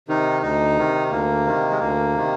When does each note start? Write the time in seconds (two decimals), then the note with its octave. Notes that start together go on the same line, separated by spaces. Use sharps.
0.08 C3 D#3 D#4
0.42 D2 D#4
0.77 C3 D#3
1.11 D2 A#3
1.46 C3 D#3
1.70 G#3
1.80 D2 A#3
2.15 C3 D#3